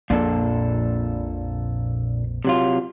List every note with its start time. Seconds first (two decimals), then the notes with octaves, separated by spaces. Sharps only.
0.10 A#1 F2 A#2 A#3 D4 A4
2.45 C3 F#3 F4